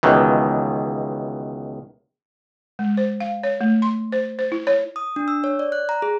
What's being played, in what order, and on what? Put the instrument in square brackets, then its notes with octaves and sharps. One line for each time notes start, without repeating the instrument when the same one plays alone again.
[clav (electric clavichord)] C#2 B2 D#3 E3
[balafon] G#3
C5
F5
C#5
A3
C6
C5
C5
E4
C#5
[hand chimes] D#6
D4
E6
C#5
D5
F#6
A#5
G#4